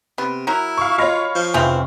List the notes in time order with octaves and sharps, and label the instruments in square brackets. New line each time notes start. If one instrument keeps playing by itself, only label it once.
[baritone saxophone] C3 [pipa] B3
[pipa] F#3 A#4 [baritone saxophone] E4
[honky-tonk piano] F5 C#6
[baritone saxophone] F4 [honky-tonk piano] C#5 F5 [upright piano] D#5 B5 A#6
[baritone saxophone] F3
[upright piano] F1 E5 F7 [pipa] C#3 E3 C4